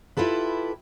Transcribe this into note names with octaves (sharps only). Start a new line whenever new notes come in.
E4 F4 G4 A4 B4